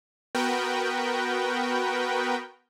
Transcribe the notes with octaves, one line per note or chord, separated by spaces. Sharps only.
B3 F#4 A#4 B4 G5